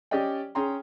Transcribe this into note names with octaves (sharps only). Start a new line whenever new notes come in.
C#4 G4 D5 D#5 G5
C#4 G#4 G5 A#5 C6